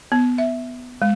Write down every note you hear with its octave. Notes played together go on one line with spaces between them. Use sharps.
B3
E5
G#3